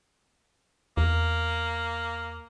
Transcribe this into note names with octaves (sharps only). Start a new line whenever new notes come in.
E2 A#3